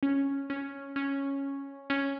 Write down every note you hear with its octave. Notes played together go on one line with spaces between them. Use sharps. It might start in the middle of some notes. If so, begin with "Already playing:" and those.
C#4
C#4
C#4
C#4